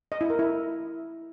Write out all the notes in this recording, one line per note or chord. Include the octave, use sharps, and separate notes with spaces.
D#5
E4
A#4
E4